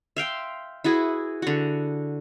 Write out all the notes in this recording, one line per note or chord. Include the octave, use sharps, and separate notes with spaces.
E5 F5 G5 C6
E4 F#4 G#4 B4
D3 F#4